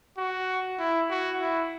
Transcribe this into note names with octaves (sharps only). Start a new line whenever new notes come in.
F#4
E4
F#4
E4